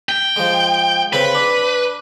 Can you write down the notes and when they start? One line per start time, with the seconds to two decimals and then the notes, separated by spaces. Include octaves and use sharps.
0.09 G5
0.36 F3 G#3
1.13 C#3 C4 B4
1.35 D4